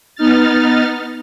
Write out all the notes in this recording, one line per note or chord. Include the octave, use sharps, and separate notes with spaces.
B3 D#4 F6 A6